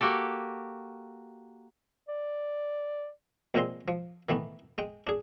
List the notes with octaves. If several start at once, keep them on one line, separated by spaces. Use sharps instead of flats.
A#3 F#4 G4 A4
D5
A#1 A#2 G#3 C4 A#5 C6
F3
D#3 E3 A3 B3
G#3 G5
D4 G#4